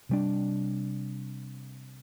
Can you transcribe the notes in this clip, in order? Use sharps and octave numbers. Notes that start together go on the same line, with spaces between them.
C3 G3 D4